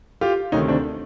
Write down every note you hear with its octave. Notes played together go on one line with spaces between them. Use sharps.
F4 G4
D2 C3 D#3 C#4 D#4
C4 D4